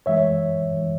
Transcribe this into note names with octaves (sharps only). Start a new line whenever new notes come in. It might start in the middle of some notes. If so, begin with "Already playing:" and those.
F#2 E3 G#3 C#5 E5
F#2 E3 G#3